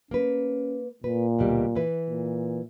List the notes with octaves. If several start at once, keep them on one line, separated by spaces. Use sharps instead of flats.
A#3 C#4 B4
A#2 B4
D2 B2 G3
E3 B4
A#2